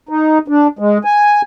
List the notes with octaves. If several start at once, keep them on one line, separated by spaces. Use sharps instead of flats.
D#4
D4
G#3
G#5